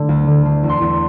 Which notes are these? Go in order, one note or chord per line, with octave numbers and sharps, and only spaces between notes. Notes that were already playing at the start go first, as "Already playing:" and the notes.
Already playing: D3 A3
D2
D3
D3
E2
C6
E2